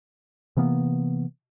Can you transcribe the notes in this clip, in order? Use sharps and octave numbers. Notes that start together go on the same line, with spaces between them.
C3 E3 A#3 B3